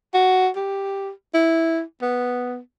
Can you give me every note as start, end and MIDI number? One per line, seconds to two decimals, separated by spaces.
0.14 0.49 66
0.56 1.10 67
1.34 1.81 64
2.02 2.59 59